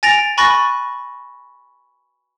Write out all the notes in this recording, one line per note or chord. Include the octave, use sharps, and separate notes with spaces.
G#5 A6 A#6 D7 F7
G#5 B5 C#6 F#6 A6 A#6